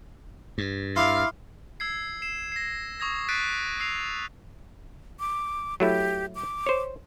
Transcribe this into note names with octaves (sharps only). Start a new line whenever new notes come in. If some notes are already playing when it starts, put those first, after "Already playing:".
G2
E4 F5 C6 D6 F6
E6 G#6 C7
C7 E7
A#6 C7
C#6 D#6 G#6 A#6
F#6 A6 B6 C7 D7 D#7
E6 C7 F7
D6
F#3 A3 E4 G4
D6
C5 C#5